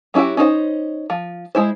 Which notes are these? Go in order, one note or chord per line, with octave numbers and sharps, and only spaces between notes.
F#3 C#4 E4 F#4 G4
C#4 D#4 F4 C5
F3
G#3 E4 C5